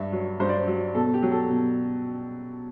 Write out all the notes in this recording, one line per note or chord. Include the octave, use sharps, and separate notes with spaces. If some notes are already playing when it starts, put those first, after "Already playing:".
Already playing: G2 E5
F#3
G2 C5
D5
C5
F#3
B2 A4
G4
F#3
A4
B2